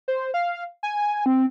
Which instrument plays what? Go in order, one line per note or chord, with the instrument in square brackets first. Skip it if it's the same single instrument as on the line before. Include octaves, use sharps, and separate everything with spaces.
[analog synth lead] C5
F5
G#5
C4